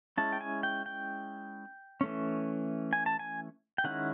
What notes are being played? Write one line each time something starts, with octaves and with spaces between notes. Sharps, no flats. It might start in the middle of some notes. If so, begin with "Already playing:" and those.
G#3 C#4 E4 A5
G5
G#5
G5
G5
E3 A3 C#4
G#5
A5
G#5
G5
D#3 G#3 C#4 E4 F#5